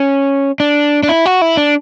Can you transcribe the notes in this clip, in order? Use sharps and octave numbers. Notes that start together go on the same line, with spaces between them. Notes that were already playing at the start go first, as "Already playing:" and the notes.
Already playing: C#4
D4
D4
E4
F#4
E4
D4